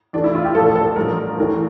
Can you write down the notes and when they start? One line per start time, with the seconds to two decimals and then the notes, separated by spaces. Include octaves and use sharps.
0.13 E2 E3 A3 D4
0.24 E4
0.35 F4
0.44 G4
0.55 A#1 A#2 F3 A3 A4
0.65 A4
0.76 A4
0.86 A4
0.96 A1 G2 F3 A3 A#4
1.38 E2 E3 A3